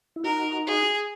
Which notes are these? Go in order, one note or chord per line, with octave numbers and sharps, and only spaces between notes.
E4
D#4 F#4 A#4
G#4